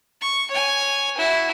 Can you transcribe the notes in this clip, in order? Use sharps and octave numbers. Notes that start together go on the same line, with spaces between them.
C#6
C#5 G#5
E4 F#4